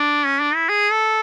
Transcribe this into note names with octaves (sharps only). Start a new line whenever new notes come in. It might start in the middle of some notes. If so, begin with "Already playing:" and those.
Already playing: D4
C#4
D4
E4
G#4
A4